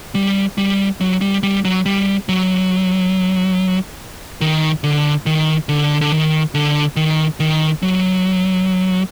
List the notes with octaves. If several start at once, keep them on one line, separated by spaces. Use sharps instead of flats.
G3
G3
F#3
G3
G3
F#3
G3
F#3
D#3
D3
D#3
D3
D3
D#3
D3
D#3
D#3
F#3